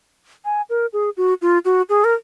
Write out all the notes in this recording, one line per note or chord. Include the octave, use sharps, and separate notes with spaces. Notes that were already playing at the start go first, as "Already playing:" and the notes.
G#5
A#4
G#4
F#4
F4
F#4
G#4
A#4